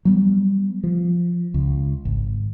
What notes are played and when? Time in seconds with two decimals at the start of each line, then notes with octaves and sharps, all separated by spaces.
0.05 F#3 G3 B3
0.84 F3
1.54 C#2
2.05 G#1